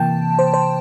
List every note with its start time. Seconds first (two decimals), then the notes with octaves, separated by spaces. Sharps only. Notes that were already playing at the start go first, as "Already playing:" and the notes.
Already playing: C3 E3 A#3 G5 A5
0.39 C5
0.54 C5